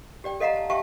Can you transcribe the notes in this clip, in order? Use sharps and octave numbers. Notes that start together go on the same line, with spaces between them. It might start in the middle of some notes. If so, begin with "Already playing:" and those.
G4 D5 G5
A4 D#5 F5 F#5 A#5
A5
G4 E5 F5 G5 A5 C#6